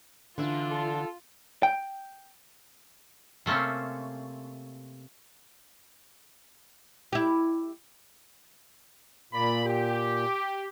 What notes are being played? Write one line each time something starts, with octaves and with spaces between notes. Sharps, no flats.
D3 E3 D4 F4 E5
A4
G5
C3 A3 A#3 C4 C#4
E4 G4
A#2 A#3 D5 B5
G4